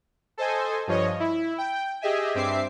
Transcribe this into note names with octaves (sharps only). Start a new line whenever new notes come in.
A4 C5 D#5 G#5
G2 F3 C#5 D#5
E4
G5
G4 G#4 D#5 E5 G#5
G2 C4 E5 D6 C7